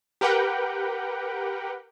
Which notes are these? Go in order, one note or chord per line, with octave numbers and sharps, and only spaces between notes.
G4 A#4 B4 F#5 G5